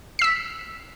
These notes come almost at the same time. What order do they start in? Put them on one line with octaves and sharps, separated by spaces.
C7 E6 B6